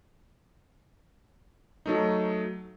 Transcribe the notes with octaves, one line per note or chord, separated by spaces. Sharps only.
F#3 A3 D#4